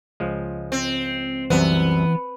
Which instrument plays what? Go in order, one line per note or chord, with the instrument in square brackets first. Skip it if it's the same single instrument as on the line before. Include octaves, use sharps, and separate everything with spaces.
[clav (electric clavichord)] C#2 F3 G#3
[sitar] C4
[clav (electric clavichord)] C2 F#2 C3 [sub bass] E3 [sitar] B3